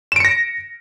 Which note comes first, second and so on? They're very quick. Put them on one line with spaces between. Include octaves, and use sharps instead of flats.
E7 D7 C#7 A#6